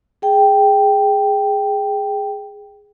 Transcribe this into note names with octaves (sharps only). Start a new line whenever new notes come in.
G#4 G5